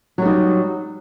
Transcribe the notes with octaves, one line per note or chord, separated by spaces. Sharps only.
F#3 G3 D#4